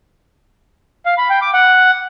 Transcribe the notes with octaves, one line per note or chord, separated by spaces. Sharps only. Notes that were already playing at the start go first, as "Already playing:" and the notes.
F5
B5
G5
D6
F#5